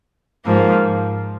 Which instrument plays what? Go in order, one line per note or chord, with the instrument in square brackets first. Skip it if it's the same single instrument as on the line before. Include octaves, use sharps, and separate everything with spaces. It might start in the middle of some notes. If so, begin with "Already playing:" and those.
[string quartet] G#2 F3 A#3